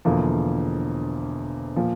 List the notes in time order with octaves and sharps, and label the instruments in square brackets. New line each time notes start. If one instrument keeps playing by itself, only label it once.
[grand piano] E1 E2 D3 F3 A#3
A#2 F3